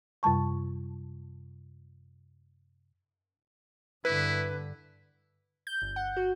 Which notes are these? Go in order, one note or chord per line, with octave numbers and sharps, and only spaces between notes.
F#2 C3 G3 A5 C#6
G2 D3 E4 B4
G6
G1
F#5
F#4